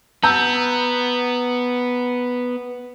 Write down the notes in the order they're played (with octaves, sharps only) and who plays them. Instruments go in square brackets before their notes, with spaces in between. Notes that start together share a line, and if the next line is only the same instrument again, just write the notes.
[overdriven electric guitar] B3 [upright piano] A#5 E6 G6